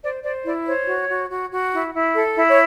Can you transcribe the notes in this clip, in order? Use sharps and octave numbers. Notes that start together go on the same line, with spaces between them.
C5 D5
C5 D5
E4 D5
C5 C#5
F#4
F#4
F#4
F#4
E4
E4
A4
E4
C#5